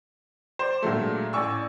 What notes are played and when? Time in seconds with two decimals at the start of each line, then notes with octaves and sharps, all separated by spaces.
0.59 C5 D5
0.82 A#2 D3 F#3 G#3 A3
1.33 A1 D5 G#5 C#6 E6